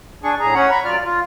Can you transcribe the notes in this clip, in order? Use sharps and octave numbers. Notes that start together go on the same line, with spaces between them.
D4 G#4 C#6
A2 G#4 A#5
C#4 C#5 F#5
A#5 B5 C#6
F#2 F#3 F4 D5 F6
F4